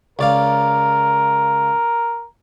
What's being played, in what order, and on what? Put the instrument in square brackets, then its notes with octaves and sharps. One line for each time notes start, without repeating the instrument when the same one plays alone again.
[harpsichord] C#2 D5 F5 [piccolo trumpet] A#4